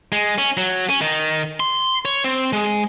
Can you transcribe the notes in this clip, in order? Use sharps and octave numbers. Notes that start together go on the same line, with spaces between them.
G#3
C#4
F#3
C#4
D#3
C6
C#5
C4
G#3